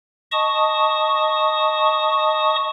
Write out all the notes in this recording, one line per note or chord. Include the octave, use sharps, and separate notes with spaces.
D#5 A5 C#6 D#6